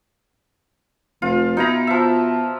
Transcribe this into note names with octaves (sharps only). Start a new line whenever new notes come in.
F1 F4
B2 D#4 E4 A#5
F3 E5